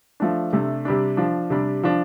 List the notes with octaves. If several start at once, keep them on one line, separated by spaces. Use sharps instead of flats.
F3 A3 D4
C3 A3 D4
C3 G3 D4
F3 D4
C3 G3 D4
F3 D4